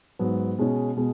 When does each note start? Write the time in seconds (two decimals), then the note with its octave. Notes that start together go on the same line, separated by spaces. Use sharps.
0.19 G#2 F#3 B3
0.58 B2 G#3 C#4
0.97 B2 G#3